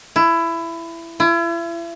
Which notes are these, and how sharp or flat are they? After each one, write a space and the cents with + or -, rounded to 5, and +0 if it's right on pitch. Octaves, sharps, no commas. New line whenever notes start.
E4 +20
E4 +40